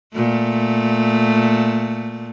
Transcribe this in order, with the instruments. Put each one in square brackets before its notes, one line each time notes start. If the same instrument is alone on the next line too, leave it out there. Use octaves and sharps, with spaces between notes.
[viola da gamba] A#2 A3